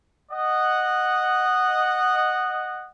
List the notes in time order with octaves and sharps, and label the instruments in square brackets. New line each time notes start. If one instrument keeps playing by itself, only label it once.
[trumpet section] D#5 F#5